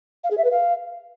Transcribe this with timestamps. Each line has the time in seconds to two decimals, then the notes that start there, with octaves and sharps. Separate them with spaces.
0.23 F5
0.30 G#4
0.37 E5
0.44 B4
0.51 F5